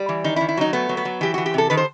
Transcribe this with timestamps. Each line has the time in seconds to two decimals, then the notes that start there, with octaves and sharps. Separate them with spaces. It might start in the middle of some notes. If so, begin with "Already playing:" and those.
Already playing: G3
0.09 E3
0.24 D#3 D#4
0.36 E4
0.41 D#3
0.49 E4
0.57 F#3 D#4
0.73 A3 B3
0.89 F#3
0.97 B3
1.05 F#3
1.21 E3 G4
1.34 E3 F#4
1.46 G4
1.54 C3 A4
1.70 D#3 B4
1.77 C5